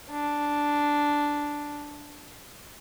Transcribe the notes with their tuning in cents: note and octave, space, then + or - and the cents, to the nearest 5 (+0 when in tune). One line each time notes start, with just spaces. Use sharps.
D4 -5